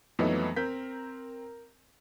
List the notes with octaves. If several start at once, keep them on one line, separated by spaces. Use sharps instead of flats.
F2 E3 F#3 A3 B3 D#4
C4 A#4 G6 B6